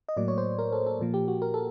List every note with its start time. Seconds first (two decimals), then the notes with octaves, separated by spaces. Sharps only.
0.09 D#5
0.17 A2 F#3 A#3 D5
0.28 C#5
0.38 C5
0.59 A#4
0.72 A4
0.86 A4
1.00 A#2 F3 A#3
1.14 G4
1.28 F#4
1.42 A#4
1.54 A4